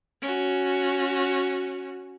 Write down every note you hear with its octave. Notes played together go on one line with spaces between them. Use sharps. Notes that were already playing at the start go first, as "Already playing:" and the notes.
C#4 F#4